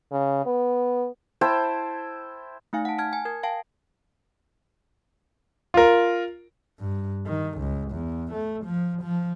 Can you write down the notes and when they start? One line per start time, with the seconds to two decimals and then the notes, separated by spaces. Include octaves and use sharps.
0.12 C#3
0.46 B3
1.41 E4 C5 G5 A5
2.73 A3 D#4 F5 G#5
2.85 F#5 A5
2.98 A5 F6 G#6
3.13 G#5
3.25 A#4 G#6
3.43 F5 G5 A5
5.74 F4 A#4
6.80 G2
7.27 D#3
7.59 C#2
7.92 E2
8.33 A3
8.65 F3
9.03 F3